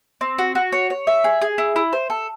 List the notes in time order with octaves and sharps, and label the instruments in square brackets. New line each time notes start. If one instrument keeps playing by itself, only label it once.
[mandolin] C4
F#4
F#4
C#5
C#5
E5
G#4
G#4
E4
E4
C5
A4